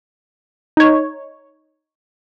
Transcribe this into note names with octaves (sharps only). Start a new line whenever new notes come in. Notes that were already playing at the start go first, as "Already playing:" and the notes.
D#4 C#5